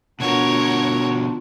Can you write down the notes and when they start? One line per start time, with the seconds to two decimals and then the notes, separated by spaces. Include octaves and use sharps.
0.20 B2 D3 B3 D4 F4 F#4 A#4 C#5